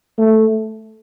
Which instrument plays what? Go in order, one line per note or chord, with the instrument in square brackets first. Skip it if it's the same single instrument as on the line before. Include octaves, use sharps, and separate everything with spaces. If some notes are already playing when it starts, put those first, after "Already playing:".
[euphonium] A3